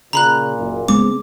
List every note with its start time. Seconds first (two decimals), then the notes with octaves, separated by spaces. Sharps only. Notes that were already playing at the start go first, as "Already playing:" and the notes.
0.13 A#2 C#3 A#5 B5 F#6
0.57 F#1
0.88 C#3 G#3 B3 C4 D6